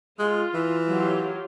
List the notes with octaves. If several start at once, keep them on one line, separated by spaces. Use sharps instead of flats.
G#3 F4
E3
F#3 F4 G4